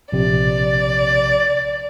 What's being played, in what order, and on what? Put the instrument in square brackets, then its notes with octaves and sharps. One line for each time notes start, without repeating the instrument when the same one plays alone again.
[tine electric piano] A#1 C3 [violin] D5